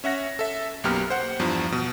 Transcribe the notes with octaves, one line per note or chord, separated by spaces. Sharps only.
C#4 E5 F#5 A#6
A4 E5
B1 F#2 A#3 B3 G4 F6
C5 F#5
E2 G2 F3
B2